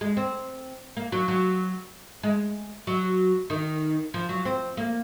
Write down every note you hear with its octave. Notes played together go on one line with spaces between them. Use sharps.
G#3
C4
A#3
F#3
F#3
G#3
F#3
D#3
F3
F#3
C4
A#3